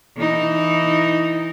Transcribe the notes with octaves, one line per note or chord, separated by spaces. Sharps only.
E3 D#4